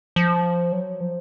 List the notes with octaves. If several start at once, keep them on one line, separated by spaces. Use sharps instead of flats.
F3
F#3
F3